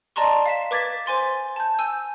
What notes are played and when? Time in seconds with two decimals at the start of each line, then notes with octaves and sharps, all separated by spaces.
0.16 D5 D#5 A5 A#5 C6 C#6
0.46 F5 B6 E7
0.71 B4 D6 G#6 A6 B6
1.06 C5 G#5 C6 A6
1.56 A5 G6
1.79 G#5 E6 G6